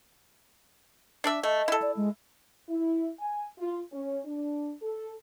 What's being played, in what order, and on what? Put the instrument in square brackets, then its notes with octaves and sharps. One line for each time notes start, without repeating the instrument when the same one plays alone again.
[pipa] D4 D5 E5
[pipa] A3 [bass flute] D#5
[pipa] E4 A4
[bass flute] D5
G#3
[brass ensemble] E4
G#5
F4
C#4
D4
A4